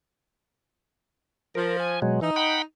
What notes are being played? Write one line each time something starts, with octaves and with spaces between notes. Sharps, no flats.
F3 A#4
G#5
B2 F#3 G#3
E3 D#4
F#5 G5 B5